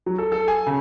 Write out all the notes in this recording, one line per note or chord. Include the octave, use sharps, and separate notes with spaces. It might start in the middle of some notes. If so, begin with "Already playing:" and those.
F#3
A4
A4
G#5
C#3